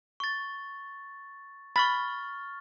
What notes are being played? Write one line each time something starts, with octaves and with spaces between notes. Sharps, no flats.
C#6 A6
B5 C#6 F6 A6